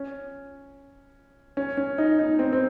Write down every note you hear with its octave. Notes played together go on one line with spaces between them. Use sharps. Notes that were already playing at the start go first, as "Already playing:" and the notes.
Already playing: C#4
C#4
C#4
D#4
D#4
C4
C4